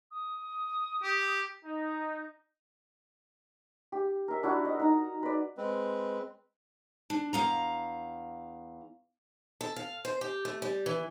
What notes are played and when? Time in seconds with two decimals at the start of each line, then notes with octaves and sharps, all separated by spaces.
0.11 D#6
1.03 G4
1.63 D#4
3.92 G4
4.28 A#4 E5
4.43 D4 E4 F#4
4.65 D#5
4.80 D#4 A#5
5.23 B4 D5
5.58 G#3 C4 B4
7.10 D4
7.33 E2 F5 A#5
9.61 A4
9.76 F5
10.05 C5
10.21 G4
10.45 A3
10.62 G3
10.86 E3